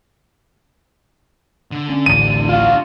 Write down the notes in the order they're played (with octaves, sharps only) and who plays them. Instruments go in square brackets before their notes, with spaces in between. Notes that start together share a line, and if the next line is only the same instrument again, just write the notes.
[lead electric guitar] D3
[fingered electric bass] C#4
[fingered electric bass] A1 D2 A2 [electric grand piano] D#7
[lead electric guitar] D4 F#4 [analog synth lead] F4